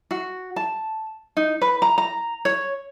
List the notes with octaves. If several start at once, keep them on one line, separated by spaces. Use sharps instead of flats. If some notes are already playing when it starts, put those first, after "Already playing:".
F#4
A5
D#4
B4
A#5
A#5
C#5